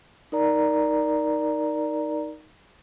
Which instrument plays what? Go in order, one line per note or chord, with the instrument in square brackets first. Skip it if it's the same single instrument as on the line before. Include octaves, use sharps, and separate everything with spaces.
[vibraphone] D#4 A#4 D5 A#5